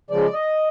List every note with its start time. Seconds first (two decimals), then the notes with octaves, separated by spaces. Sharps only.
0.10 C#3 F3 G#3 D5
0.33 D#5